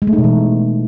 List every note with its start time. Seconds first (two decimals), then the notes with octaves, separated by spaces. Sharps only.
0.02 G#3
0.07 A3
0.13 D#4
0.18 B2
0.24 E3